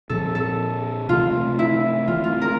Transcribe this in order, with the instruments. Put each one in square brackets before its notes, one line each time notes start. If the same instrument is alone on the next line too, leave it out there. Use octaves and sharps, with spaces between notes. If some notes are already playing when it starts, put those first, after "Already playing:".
[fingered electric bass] A#2 F3 C4 [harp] A4
[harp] A4
[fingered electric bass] C3 E3 A3 C4 [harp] F4
[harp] E4
[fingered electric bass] E3 A3 C4 [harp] F4
[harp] F4
A#4